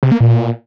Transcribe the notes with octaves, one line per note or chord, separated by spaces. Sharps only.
C3
A#3
A#2